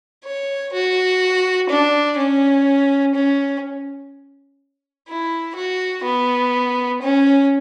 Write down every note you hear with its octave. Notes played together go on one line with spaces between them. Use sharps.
C#5
F#4
D4
C#4
C#4
E4
F#4
B3
C#4